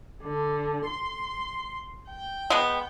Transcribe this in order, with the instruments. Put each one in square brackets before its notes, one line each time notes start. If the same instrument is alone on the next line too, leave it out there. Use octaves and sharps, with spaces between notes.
[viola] D3
C6
G5
[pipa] G#3 B3